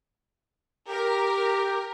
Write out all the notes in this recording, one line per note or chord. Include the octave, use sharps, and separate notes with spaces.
G4 A#4